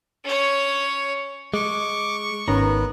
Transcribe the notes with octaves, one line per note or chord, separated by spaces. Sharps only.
C#4 C#5
G#3 C#6 D6
G#1 D#3 B3 C#4 A#5